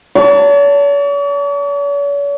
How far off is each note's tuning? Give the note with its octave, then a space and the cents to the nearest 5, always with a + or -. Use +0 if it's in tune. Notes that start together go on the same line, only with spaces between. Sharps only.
C#5 +45 A5 +20